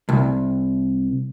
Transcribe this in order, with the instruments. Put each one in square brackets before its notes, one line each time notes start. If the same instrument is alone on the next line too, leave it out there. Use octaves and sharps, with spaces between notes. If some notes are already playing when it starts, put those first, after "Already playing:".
[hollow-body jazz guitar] C2